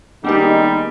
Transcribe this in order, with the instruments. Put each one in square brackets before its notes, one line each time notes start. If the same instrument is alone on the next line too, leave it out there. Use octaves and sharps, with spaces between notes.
[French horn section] D#3 G#3 D#4 [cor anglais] G3 [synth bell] A#3 B3 G4